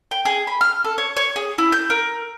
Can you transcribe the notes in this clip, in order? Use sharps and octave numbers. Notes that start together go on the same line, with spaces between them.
G5
G#4
B5
F6
A4
C#5
C#5
G#4
E4
G6
A#4